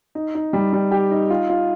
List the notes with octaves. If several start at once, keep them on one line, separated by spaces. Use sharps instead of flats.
D#4
D#4
G3
G3
G4
D#4
F4
F4